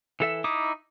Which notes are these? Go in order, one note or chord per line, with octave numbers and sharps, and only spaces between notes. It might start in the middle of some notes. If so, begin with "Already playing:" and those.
E3 A4 E5
D#4 E4 D6 D#6